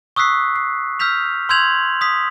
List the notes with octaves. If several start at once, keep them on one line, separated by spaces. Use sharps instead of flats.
C#6 D#6 E6 F#6 B6 C7
C7
E6 F6 G6 B6 F7
C6 E6 G6 G#6 F7 F#7
D#6 B6